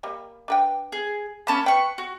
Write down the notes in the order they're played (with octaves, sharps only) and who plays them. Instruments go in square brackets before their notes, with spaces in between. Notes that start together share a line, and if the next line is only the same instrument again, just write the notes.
[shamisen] G3 A#3
D4 B4 G5
[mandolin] G#4
[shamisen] A#3 [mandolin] C#4 A5 B5
[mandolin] B4 C#6 [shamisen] G5
[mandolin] F#4